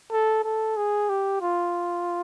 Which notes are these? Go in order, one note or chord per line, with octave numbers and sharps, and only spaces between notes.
A4
A4
G#4
G4
F4